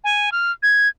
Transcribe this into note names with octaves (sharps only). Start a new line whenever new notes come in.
G#5
F6
G#6